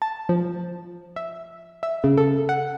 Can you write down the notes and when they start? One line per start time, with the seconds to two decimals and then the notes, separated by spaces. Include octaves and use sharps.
0.02 A5
0.29 F3
1.16 E5
1.83 E5
2.04 C#3
2.17 A4
2.49 F#5